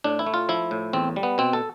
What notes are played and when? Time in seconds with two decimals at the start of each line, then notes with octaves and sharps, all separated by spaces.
0.04 A2 D4
0.19 E4
0.26 A3
0.34 F4
0.49 F3 E4
0.71 A2
0.93 E2 C4
1.16 G3
1.23 B3
1.38 B2 C4
1.53 A4